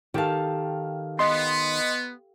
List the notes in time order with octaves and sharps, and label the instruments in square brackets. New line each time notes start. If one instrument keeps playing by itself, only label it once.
[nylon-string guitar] D#3 A5 [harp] G4 A4 F5
[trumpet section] B3 [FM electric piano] D#5 C6